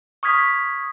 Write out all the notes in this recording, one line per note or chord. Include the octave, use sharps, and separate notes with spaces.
C#6 D#6 F6 G#6 B6